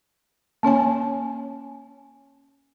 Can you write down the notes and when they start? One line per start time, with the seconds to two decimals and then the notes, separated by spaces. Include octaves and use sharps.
0.63 A#3 C#4 C#5 G#5